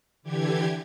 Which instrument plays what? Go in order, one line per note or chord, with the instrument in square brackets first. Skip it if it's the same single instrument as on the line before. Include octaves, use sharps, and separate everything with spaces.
[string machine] D3 E3 G4 G#6